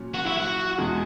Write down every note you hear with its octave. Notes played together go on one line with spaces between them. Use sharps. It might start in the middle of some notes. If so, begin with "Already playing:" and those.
Already playing: A#2 F#3 C#4
F#4
E4
F#4
E2 B2 G#3